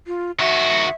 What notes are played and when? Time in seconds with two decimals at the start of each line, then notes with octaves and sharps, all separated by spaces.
0.07 F4
0.39 D#3 F#4 E5